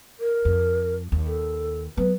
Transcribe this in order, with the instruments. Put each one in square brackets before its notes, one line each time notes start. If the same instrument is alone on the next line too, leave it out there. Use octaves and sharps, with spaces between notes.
[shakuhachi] A#4
[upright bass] F2
D#2
[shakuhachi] A4
[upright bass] F#3 B3 [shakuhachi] B4